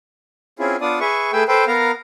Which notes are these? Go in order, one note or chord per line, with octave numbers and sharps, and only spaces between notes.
C4 C#4 E4 F4 G#4
B3 D4 F4 D5 D#6
G#4 B4 E5 C#6
A3 G#4 B4 G5 E6
A4 B4 C5 G5
B3 A#4 F5 A#5